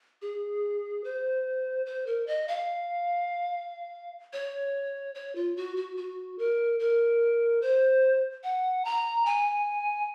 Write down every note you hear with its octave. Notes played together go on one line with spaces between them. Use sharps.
G#4
C5
C5
A#4
D#5
F5
C#5
C#5
F4
F#4
F#4
F#4
A#4
A#4
C5
F#5
A#5
G#5